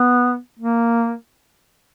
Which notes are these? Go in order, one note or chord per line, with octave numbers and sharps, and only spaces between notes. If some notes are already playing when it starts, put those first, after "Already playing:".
Already playing: B3
A#3